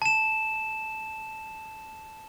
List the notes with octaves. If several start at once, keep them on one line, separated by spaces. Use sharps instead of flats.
A5 E7